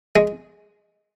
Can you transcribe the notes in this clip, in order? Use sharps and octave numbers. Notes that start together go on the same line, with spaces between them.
G#3